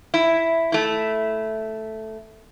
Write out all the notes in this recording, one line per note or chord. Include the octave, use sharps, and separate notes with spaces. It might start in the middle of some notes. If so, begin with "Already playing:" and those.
E4
A3 E4